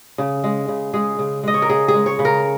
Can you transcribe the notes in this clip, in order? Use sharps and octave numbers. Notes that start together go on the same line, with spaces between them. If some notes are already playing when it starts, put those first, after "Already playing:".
C#3
G#3
C#3
G#3 G#4
C#3
G#3 D#5
C#5
A#4
C#3 G#4
G#4
G#3
C#5
C#3
A#4